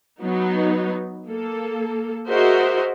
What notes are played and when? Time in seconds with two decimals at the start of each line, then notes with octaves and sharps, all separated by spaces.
0.22 F#3 B3 D#4
1.27 A#3 A4
2.28 F#4 G#4 A#4 C5 D#5 E5